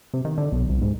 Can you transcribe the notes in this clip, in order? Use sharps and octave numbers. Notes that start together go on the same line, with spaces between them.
C3
D#3
D3
B1
C2
G#2